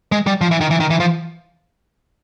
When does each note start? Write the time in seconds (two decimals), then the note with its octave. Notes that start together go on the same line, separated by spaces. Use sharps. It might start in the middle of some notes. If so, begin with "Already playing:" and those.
0.12 G#3
0.27 G3
0.41 F3
0.51 E3
0.61 D#3
0.71 E3
0.80 D#3
0.90 E3
1.00 F3